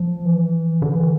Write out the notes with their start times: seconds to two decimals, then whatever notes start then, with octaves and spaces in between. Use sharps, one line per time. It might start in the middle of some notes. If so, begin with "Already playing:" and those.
Already playing: F3
0.25 E3
0.82 D3
0.96 E3